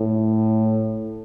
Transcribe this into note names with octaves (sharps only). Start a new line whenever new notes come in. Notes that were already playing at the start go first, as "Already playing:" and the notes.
Already playing: A2